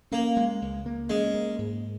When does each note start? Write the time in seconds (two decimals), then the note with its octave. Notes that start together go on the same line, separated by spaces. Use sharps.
0.12 A#3 C#4
0.37 G#3
0.62 C#2
0.86 A#3
1.10 G#3 C#4
1.34 A#3
1.58 G#2